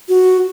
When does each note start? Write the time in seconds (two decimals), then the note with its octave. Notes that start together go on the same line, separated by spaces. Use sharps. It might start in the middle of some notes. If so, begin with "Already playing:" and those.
0.09 F#4